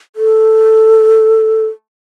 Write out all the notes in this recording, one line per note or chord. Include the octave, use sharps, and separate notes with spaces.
A4